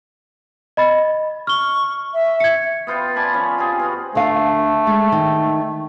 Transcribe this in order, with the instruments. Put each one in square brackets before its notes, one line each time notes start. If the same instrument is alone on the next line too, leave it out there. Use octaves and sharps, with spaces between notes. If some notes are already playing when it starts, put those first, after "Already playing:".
[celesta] D#5 B5 A6
[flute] C#6 [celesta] F6 G7
[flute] E5
[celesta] G#6 C#7
[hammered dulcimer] B3 F4 C5 G5
D5 G#5 A5 B5
F3 C#4
C4 F4 G4 G#4
B3 F4 F#4
[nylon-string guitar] D3 F5 [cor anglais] A3
[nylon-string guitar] G#3
D#3